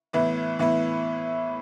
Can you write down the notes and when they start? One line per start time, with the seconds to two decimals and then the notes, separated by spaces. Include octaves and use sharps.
0.13 A2 E3 B3 E4
0.59 A2 E3 B3 E4